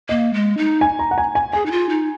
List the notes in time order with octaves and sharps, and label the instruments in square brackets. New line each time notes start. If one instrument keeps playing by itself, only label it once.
[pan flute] A#3 [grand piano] D#5
[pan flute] G#3
D#4
[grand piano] G#5
A#5
F#5
G#5
G#5
[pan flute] G#4 [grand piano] G#5
[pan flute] D#4
F4
D#4